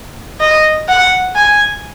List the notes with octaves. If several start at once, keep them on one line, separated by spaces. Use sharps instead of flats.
D#5
F#5
G#5